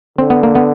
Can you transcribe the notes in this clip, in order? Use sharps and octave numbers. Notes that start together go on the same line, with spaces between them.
D3 C4
B3
A#3
B3